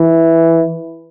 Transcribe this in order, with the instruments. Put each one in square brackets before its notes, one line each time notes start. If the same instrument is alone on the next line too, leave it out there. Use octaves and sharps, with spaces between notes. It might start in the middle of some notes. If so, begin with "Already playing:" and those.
Already playing: [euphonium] E3